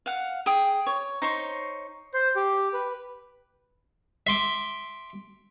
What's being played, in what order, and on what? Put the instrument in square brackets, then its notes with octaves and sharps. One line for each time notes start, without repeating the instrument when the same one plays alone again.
[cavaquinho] F5 F#5
G#4 G5 D#6
C#5
D#4 C5 C#5 C#6
[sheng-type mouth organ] C5
G4
B4
[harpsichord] E5 C6 D6